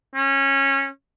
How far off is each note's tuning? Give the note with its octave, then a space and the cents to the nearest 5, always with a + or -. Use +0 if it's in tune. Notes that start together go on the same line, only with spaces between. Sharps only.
C#4 -20